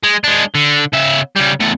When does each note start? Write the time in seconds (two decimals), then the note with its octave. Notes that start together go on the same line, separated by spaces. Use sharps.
0.03 G#3
0.24 G#3 D4
0.55 D3
0.93 C#3 E5
1.36 C#3 G3
1.61 E2 A3